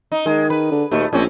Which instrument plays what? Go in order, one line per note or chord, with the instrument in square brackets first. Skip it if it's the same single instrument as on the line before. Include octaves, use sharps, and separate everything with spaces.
[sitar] D#4
[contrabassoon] D#3 [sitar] G#3
[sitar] B4
[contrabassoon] D3
[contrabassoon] D#2 [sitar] A#2 A3
[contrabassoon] A#1 [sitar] A2 C4 C#4